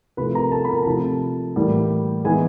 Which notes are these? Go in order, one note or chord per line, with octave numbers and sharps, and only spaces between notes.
C3 F3 A3 B4 B5
A#4 A#5
A4 A5
B5
A#4 A#5
A#5
C3 F3 A3 A4 A5
A2 E3 G3 A#3
E3 G#3 B3 D#4 G#4 G#5